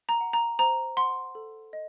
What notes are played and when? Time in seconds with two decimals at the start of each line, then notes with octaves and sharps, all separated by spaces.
0.09 A#5
0.21 F#5
0.33 A#5
0.59 C5 A#5
0.97 F#5 C6
1.35 A4
1.73 D#5